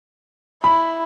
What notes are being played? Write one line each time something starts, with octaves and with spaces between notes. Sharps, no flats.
E4 B5